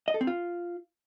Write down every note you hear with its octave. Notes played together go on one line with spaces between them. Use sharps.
D#5
A4
C4
F4